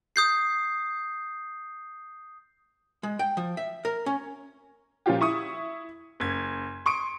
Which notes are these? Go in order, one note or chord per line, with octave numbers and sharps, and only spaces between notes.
D#6 G6 C7
G#3
G5
F3
E5
A#4
C#4
A#2 F3 C#4 F4 G4
E4 C#6 D#6
F#1 G#6
C6 C#6 D#6 D7